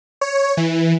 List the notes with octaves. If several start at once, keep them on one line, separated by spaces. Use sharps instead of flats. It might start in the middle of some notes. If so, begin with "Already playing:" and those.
C#5
E3